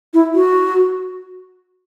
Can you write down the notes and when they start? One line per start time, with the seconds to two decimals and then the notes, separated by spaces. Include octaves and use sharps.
0.14 E4
0.35 F#4